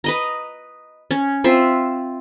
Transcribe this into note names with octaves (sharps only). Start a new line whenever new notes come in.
B4 D#5 A#5
C#4
C4 F4 E5